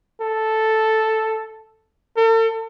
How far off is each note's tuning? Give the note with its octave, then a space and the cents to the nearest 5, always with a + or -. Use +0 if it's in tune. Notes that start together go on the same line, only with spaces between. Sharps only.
A4 +0
A4 +40